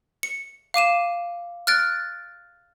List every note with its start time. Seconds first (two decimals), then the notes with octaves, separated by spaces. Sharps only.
0.23 C#7
0.74 F5 D6 D#7 E7
1.67 F6 F#6 A6 D7